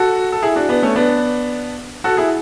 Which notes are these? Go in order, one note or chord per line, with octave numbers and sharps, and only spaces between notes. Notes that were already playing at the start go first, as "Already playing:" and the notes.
Already playing: F#4 A4
A4
E4 G#4
D4 F#4
B3 D4
A3 C#4
B3 D4
F#4 A4
E4 G#4